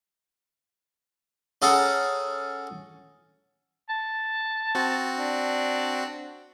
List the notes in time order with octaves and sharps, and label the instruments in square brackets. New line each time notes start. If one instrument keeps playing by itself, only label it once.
[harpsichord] C#4 G#4 A4 F#5 A#5
[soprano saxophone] A5
[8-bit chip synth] C4 F#4
[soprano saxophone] D4